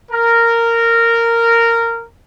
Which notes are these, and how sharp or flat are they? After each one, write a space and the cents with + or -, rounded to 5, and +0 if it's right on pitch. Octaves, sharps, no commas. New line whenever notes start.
A#4 -10